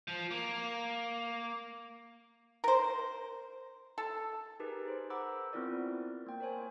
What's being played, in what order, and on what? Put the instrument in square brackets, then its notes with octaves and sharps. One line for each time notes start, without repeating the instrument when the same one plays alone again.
[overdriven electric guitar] F3
A#3
[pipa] A#4 C5
A4
[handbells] D#4 G4 G#4 A#4 B4
G#4 C5
C5 F#5 A#5 B5 D6 E6
B3 C4 E4 F4 A#4 D5
A#3 G5
A#4 C5 C#5 G#5